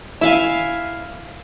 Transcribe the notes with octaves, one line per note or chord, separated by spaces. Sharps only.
E4 E5 F5 G#5